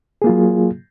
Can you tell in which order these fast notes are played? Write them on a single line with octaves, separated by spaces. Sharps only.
G#4 A#3 F4 F#3